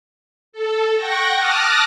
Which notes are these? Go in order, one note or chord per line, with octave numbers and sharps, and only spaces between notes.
A4
F#5 G5 C#6 A#6
A5 D6 D#6 F6 F#6 A#6